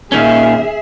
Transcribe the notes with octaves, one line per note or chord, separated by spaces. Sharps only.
A#2 D#3 C#4 G#4 E5